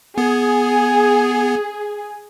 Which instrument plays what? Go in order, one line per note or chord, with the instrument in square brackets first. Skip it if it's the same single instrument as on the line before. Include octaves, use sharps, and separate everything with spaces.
[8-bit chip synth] B3 [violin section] G#4